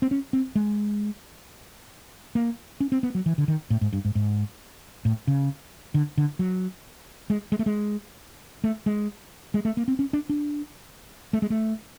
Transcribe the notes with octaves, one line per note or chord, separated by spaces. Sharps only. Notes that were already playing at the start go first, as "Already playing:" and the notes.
C4
C#4
C4
G#3
A#3
C#4
C4
B3
F#3
E3
D3
D#3
A2
G#2
G2
G#2
G#2
A2
C#3
D3
D3
F#3
G#3
G#3
A3
G#3
A3
G#3
G#3
A3
A#3
C4
C#4
D4
D4
A3
G#3
A3